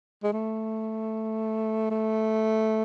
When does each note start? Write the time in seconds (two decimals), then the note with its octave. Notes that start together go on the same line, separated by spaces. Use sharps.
0.24 G#3
0.33 A3
1.91 A3